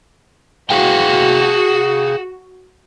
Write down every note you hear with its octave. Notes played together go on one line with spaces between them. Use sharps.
F#4 G#4 F5 G5